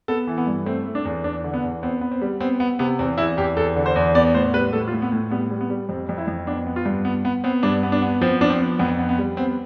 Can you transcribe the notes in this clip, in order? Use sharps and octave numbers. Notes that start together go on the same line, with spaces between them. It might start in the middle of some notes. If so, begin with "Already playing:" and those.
B3 A4
E3
B3
G2
A3 C4
A3
D4
E2
E2 D4
D3
B3
E2
B3 C4
B3
C4
G3
B3 C4
B3
C3 B3
E2 C4
E2 E4
E2 G4
E2 A4
D3
C5
E2
B3 D5
A2 C5
G3 B4
A2 A4
F4
A2
B3
A2
G3 B3
G3
B3
G3
F2 C4
F2
E4
F2
B3 D4
B3
F4
G2
B3
B3
B3 C4
G2 D4
B3
D4
B3
F3 C4
F3 D4
C4
B3
F2 B3
B3
B3
G3
B3 C4